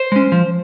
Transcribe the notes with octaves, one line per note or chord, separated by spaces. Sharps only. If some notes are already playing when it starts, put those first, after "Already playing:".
Already playing: C5
G#3 C#4
F3